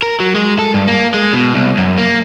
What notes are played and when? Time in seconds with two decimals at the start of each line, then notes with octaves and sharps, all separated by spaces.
0.02 A#4
0.20 F#3
0.35 G#3
0.59 A4
0.74 G2
0.88 A#3
1.14 G#3
1.33 B2
1.54 C2
1.77 F#2
1.98 A#3